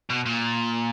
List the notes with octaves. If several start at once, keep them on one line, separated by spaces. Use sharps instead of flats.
B2
A#2